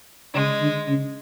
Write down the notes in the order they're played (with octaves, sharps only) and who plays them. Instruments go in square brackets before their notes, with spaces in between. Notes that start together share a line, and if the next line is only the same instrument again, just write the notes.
[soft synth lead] C#3 [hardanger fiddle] G#3
[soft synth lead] D3
C#3